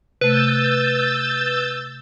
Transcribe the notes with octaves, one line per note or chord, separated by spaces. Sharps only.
C3 A3 B4 E6 G6 A6